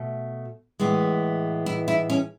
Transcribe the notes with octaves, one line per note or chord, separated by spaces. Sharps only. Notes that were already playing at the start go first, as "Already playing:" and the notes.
Already playing: B2 A3
A2 E3 G#3 B3
E4
E4
C#4